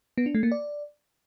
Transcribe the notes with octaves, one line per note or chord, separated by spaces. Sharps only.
B3
D4
A3
A#3
D5